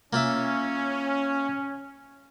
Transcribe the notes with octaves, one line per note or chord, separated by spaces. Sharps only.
A#3 C#4 F4 E5